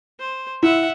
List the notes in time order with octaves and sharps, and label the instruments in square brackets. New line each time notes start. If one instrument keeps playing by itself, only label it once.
[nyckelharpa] C5
[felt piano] E4 [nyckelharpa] E5 F#5